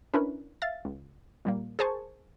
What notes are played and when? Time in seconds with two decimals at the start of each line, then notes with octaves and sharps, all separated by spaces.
0.14 C#4 D4 E4 A#4 B4
0.62 E5 F5 A6
0.85 C#2
1.45 A#2 G3 A#3
1.79 G#4 A#4 C5 G#5 A5 C#6